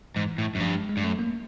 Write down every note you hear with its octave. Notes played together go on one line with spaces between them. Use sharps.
G#2 E3
A2
F#2
G2 F3
G#3
G#3
G2
F#2 A3
A#3